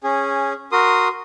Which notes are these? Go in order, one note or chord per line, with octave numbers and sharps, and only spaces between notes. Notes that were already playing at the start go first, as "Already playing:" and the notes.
C#4 G#4
F#4 A#4 C6 D#6